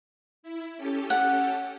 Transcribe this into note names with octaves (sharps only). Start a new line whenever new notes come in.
E4
C#4 G4 A4
F#5